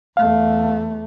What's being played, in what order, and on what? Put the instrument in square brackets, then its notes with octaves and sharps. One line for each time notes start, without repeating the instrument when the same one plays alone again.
[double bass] E2 A3 [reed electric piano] F5